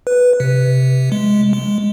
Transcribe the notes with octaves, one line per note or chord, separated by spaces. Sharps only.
B4
C3
G#3
G#3